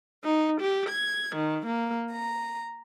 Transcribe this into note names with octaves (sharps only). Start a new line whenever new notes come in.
D#4
G4
G#6
D#3
A#3
A#5